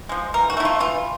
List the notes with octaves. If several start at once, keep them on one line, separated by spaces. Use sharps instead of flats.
F3 G#3
E3 A#4
F#4
A3 E4
F4
E3 F4